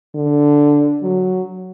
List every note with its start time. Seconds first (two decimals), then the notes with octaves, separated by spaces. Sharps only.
0.15 D3
1.02 F#3